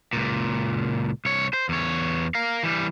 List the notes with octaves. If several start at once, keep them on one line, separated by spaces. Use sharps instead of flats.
C#2 A#2
C2 C#5
C5
E2 C#5
A#4 F5
E3 G3